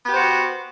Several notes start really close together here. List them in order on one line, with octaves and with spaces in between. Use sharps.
B3 G4 C5 F#4